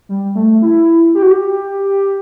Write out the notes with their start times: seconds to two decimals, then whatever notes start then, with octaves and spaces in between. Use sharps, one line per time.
0.09 G3
0.35 A3
0.62 E4
1.15 G4
1.23 F#4
1.31 G4